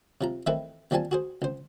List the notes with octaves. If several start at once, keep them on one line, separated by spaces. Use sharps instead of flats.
C3 F3 A#5
D#3 E3 A3 C4 E4 B4
D#2 F3 G3 C4 G#5 A5
F#4 G#4 C5
C#2 C5